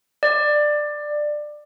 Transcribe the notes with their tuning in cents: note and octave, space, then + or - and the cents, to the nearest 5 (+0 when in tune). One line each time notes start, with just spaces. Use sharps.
D5 +15